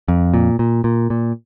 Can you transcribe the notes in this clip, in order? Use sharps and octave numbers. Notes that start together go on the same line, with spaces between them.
F2
A#2
A#2
A#2
A#2